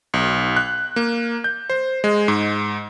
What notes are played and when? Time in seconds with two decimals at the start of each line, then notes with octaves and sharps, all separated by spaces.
0.14 B1
0.56 F#6
0.96 A#3
1.44 G6
1.70 C5
2.04 G#3
2.28 G#2